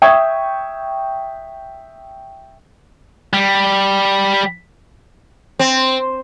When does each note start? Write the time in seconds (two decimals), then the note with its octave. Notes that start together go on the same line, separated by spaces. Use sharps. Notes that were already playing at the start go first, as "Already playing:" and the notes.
0.02 E5 G5 C#6 D#6 G#6
3.34 G3
5.59 C4